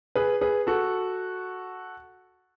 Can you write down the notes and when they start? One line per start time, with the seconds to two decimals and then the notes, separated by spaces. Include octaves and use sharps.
0.15 G#4 B4
0.41 G#4 B4
0.67 F#4 A4